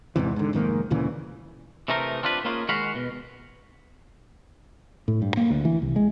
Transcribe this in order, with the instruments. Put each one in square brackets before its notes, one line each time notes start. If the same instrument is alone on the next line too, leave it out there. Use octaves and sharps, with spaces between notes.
[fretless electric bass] E2 G#2 C3 E3
G#2 D3
F1 G#2 D#3 A#3
D2 A#2 C#3 E3
[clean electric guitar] C3 E3 A3 D#4 A#4
C4 D4 F4 G4 B4
A#3 C#4 D#4 F4 G#4
D#3 G#3 F#4 F5 B5
B2
[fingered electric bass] A2
G2
A#3
D2
E3
C2
G#3